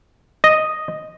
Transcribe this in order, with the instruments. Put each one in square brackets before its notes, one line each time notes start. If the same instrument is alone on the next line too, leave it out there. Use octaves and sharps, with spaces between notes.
[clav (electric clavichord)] D#5